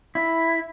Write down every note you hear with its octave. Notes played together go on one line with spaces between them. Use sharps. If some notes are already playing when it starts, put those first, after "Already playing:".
E4